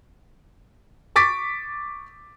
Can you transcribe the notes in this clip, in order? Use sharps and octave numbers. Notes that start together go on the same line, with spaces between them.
C#6 D6 A6 B6 D7